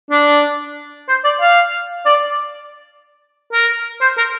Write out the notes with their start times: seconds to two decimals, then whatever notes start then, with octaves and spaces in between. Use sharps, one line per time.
0.11 D4
1.08 C5
1.24 D5
1.41 F5
2.06 D5
3.53 A#4
4.01 C5
4.17 A#4